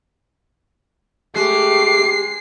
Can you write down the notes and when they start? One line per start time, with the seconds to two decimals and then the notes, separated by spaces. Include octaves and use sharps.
1.36 G#3 A3 G4 D6 C7